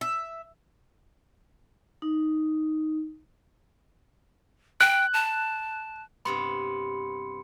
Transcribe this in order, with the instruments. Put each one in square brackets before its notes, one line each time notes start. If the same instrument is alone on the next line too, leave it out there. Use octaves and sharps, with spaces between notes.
[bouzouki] E5
[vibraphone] D#4
[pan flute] G5 [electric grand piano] F#6
[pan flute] A5
[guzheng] G2 C3 B3 [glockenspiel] B5 C6 C#7